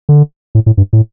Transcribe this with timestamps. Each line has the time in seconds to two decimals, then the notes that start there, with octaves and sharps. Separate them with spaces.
0.09 D3
0.55 A2
0.66 A2
0.77 G2
0.93 A2